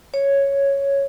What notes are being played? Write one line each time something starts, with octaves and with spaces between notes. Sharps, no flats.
C#5